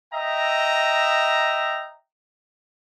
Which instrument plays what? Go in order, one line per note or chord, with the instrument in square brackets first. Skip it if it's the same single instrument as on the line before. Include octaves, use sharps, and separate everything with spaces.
[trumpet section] D#5 E5 G5 A#5